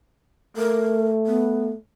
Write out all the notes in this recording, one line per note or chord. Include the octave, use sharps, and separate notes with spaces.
A3 A#4
B3